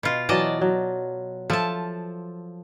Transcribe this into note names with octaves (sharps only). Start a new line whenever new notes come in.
B2 F4
E3 F#3 D5 D#5 A5
F#3
F3 A4 E5 A5